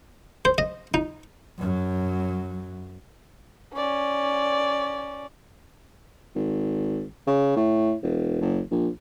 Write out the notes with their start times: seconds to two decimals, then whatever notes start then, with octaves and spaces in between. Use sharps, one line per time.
0.45 C5
0.58 D#5
0.94 D#4
1.58 F#2 F#3
3.74 C#4 D5
6.35 G#1
7.27 C#3
7.56 A2
8.03 E1
8.41 F#1
8.71 A#1